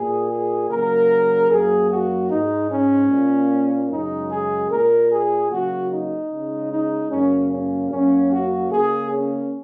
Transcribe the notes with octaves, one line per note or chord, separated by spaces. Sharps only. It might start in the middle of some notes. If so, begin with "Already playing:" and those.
Already playing: A#2 A#3 G#4
G#4
C#3 F#3 A#3 A#4
F#2 F#3 A#3 G#4
F#4
G#2 D#4
G#3
C#4
A#2 A#3
F#2 C#3 G#3 D#4
G#4
A#2 A#3 A#4
G#4
C#3 F#3 A#3 F#4
D#4
C#3 G#3
D#4
F#2 C#3 A#3 C#4
C#4
F#2 F#3 A#3 C#4
F#4
C#3 A#3 G#4
C#4